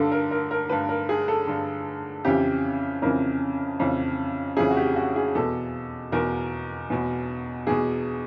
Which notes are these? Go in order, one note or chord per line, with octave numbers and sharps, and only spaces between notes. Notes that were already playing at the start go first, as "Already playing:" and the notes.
Already playing: G2 D3 A4
A#4
A#4
A#4
G2 D3 B4
A#4
G#4
A4
G2 D3
F2 C#3 E3 G4
F2 C#3 E3 A#4
F2 C#3 E3
F2 C#3 E3 G#4
F#4
G4
F#4
G#4
E2 B2 A4
E2 B2 A#4
E2 B2
E2 B2 G#4